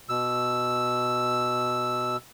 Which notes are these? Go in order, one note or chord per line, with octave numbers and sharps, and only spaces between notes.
B2 E6